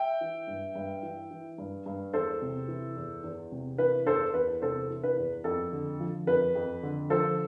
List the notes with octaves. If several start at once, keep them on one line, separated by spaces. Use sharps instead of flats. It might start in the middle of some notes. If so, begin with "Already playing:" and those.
Already playing: E5 G5
E3
G2
G2
E3
E3
G2
G2
E2 A4 C5
C3
E3
E2
E2
C3
E3 B4
E2 A4 C5
E2 B4
C3 A4 C5
E3
B4
E2
F2 A4
D3
F3
F2 B4
F2
D3
F3 A4 C5